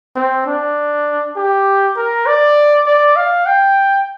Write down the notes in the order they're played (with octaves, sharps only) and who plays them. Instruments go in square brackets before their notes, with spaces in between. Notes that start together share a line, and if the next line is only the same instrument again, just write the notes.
[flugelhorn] C4
D4
G4
A#4
D5
D5
F5
G5